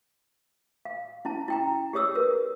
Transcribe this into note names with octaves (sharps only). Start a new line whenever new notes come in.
F5
C#4 E4 A5
E4 G5 A#5
G4 G#4 C#5 D#6 E6
A#4 B4